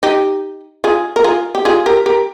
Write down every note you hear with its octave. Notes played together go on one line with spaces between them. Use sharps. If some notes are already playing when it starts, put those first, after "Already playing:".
D#4 G4
F4 G#4
A#4
F4 G#4
G4
F4 G#4
G4 A#4
G4 A#4